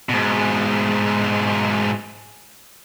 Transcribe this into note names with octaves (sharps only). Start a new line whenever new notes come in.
G#2 B2